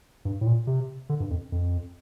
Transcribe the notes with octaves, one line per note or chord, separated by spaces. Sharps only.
G2
A2
A#2
C3
D3
G2
F2
F2